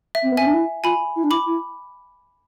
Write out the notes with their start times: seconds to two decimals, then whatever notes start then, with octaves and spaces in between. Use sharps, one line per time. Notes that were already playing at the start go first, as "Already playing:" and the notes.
0.15 E5
0.22 C4
0.31 B3
0.37 C4 E5 G#5
0.46 D4
0.53 E4
0.84 F4 G#5 B5
1.16 E4
1.23 D4
1.30 E4 B5 D6
1.46 E4